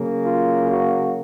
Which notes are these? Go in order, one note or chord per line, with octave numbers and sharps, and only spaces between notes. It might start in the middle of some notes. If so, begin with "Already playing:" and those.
Already playing: C#3 F#3 A#3
F4
F#4